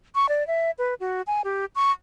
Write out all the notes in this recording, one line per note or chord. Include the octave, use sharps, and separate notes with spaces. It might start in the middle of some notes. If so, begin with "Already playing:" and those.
C#6
D5
E5
B4
F#4
G#5
G4
C#6